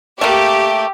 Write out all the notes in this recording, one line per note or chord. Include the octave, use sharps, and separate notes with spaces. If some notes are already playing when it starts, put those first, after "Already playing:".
A3 A#3 G4